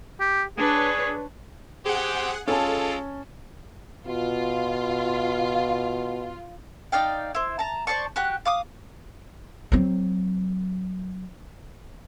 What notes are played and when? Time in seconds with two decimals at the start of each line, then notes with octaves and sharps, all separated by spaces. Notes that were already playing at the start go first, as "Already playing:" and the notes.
0.20 G4
0.58 D4 G#4 B4 C#5
1.86 G4 G#4 C5 F#5 G5
2.47 G#3 C#4 F4 A4 G#5 A5
4.07 B2 F4
6.92 D#4 D5 F5 G5
7.35 E4 C5
7.59 A5 A#5
7.87 C5 D5 A5 C#6
8.16 F#4 G4 F#6
8.45 F5 D6 D#6
9.72 F#3 C4